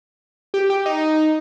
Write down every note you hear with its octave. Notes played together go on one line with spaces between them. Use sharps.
G4
G4
D#4